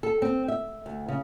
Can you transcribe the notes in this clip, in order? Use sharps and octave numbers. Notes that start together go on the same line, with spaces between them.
A4
C4
E5
D2
C#3